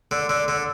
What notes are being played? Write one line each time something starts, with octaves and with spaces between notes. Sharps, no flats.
D3
D3
D3